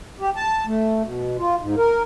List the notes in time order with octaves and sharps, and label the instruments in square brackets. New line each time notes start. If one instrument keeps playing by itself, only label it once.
[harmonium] G4
A5
A3
B2
F4
G#2
A#4